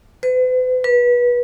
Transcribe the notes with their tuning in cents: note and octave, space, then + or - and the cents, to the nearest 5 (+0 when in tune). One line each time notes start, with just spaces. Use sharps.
B4 +45
B4 -25